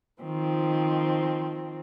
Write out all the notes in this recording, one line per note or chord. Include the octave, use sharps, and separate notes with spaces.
D#3 F3 C4